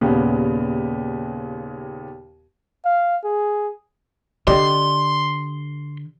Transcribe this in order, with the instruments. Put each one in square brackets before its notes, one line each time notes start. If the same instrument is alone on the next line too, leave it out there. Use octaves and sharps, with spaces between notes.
[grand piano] D#2 A#2 C#3 B3 G4
[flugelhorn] F5
G#4
[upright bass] D3 [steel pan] G4 D5 D#5 [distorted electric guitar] C6